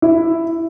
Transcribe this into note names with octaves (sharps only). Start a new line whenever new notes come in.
E4